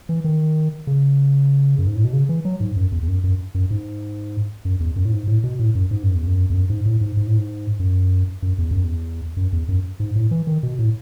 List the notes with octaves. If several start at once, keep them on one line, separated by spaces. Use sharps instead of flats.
E3
D#3
C#3
F#2
G#2
A2
B2
C#3
E3
F#3
G#2
F#2
E2
E2
F#2
F#2
F#2
G#2
F#2
E2
F#2
A2
G#2
A2
B2
A2
F#2
G#2
F#2
E2
F#2
E2
F#2
G#2
A2
G#2
G#2
A2
G#2
F#2
F#2
E2
F#2
E2
F#2
E2
F#2
G#2
A2
E3
D#3
B2
A2